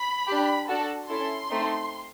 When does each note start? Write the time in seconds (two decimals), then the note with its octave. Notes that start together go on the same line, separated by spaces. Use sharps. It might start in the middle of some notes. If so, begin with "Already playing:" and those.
Already playing: B5
0.27 D4 G4
0.68 D4 F#4 A4
1.08 C#4 E4 A4 C6
1.50 A3 C4 D#4